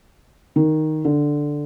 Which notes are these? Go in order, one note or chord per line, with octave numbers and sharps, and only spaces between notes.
D#3
D3